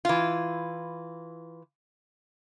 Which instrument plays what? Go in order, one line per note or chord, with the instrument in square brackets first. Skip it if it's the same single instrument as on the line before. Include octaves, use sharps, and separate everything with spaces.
[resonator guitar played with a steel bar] E3 F4